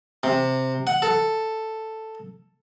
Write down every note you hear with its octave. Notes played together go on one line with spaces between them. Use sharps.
C3
F#5
A4